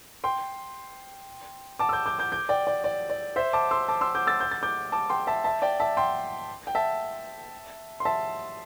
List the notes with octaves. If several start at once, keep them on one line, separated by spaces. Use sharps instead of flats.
G5 C6
A5 D6
E6
D6 G6
D6 G6
D6 G6
D6 G6
D5 G5
D5 G5
D5
D5
C5 E5
A5 D6
C6 E6
A5 D6
C6 E6
D6 G6
E6 A6
G6
A6
D6 G6
A5 D6
G5 C6
E5 A5
E5 A5
D5 G5
E5 A5
G5 C6
G5
E5 A5
C6
E5 A5